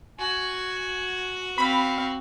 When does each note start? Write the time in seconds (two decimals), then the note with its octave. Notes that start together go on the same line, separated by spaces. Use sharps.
0.19 F#4 G#5
1.58 C4 F5 B5